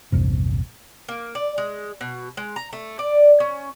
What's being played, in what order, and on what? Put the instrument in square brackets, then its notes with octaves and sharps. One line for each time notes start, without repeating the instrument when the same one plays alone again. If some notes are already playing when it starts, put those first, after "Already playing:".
[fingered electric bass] A#1 E2 G2 C3
[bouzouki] A#3
D5
G#3
B2
G#3
A#5
A3
D5
C#4